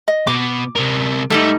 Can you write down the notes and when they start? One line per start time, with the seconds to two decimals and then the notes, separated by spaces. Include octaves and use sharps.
0.08 D#5
0.27 B2 D6
0.75 C3 A#4
1.30 G#2 G3 A3 D#4 A4